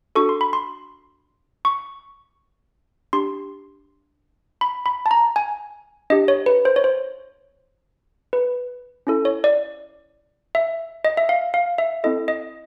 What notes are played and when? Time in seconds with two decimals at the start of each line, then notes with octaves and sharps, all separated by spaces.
0.15 D4 F#4 A4 C#6
0.29 C6
0.41 B5
0.53 C6
1.65 C#6
3.13 D4 G4 C6
4.61 B5
4.86 B5
5.06 A5
5.11 A#5
5.36 G#5
6.10 D4 G4 D#5
6.28 C#5
6.46 B4
6.65 C5
6.76 C#5
6.84 C5
8.33 B4
9.07 C#4 E4 A4
9.25 C#5
9.44 D5
10.55 E5
11.05 D#5
11.17 E5
11.29 F5
11.54 F5
11.78 E5
12.04 C4 E4 A4 D#5
12.28 D#5